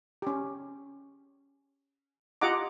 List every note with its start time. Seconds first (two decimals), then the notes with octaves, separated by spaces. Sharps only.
0.22 C#4 G4
2.41 F4 G4 D#5 F#5 A#5 D6